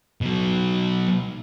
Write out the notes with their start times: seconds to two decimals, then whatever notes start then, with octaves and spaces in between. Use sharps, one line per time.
0.21 B2 F#3